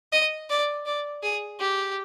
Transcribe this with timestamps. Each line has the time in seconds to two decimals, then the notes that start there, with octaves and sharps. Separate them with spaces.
0.12 D#5
0.50 D5
0.86 D5
1.23 G#4
1.60 G4